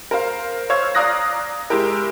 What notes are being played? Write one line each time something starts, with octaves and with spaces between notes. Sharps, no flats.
A#4 C5 F5
C5 C#5 F5 E6 G#6
D5 F5 A#5 D#6 F#6 A#6
G#3 E4 G4 A#4